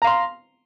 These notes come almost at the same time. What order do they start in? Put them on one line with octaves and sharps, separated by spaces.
A#5 F5 C6